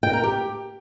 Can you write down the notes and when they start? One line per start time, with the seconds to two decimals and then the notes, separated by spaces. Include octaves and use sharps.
0.03 G5
0.13 A#4
0.23 G4